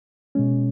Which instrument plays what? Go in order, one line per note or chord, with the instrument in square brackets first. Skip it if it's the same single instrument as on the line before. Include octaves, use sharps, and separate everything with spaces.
[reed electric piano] B2 G#3 C#4